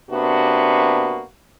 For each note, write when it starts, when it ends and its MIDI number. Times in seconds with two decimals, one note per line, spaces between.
0.11 1.22 48
0.11 1.22 58
0.11 1.22 59
0.11 1.22 62
0.11 1.22 66